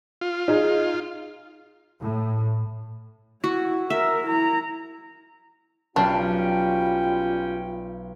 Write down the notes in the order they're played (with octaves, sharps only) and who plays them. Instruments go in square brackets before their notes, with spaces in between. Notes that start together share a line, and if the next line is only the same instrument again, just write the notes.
[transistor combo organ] F4
[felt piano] D#4 G#4
[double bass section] A2
[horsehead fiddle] E4 [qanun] F#4
[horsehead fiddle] A#4 [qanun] E5
[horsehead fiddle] E4 A#5
[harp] B1 F5 [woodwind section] G3 C#4 G5 [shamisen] D4 [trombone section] F4